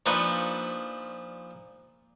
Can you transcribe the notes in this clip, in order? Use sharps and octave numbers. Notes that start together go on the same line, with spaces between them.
A#2 F3 D4 D#4 B4 C#6